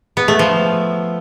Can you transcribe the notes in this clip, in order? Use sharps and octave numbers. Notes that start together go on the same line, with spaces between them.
B3
A3
F3